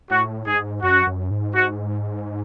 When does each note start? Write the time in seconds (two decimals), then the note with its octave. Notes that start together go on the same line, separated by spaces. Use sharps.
0.10 A2 F#4
0.47 G#2 G#4
0.83 F#2 F#4
1.07 F#2
1.31 G#2
1.55 F#4